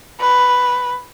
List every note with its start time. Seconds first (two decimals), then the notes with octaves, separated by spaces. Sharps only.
0.20 B4